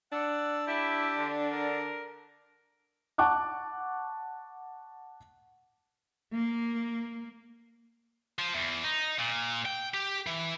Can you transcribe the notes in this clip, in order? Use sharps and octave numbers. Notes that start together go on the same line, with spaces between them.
D4 D5 F#5 E6
E4 G4
D3
A#4
F#5 A5 C#6 D6 F#6
A#3
F3
E2
D#4
A#2
G5
G4
E3